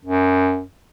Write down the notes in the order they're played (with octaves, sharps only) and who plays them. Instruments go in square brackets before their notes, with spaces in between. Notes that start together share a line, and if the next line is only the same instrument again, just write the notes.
[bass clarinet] F#2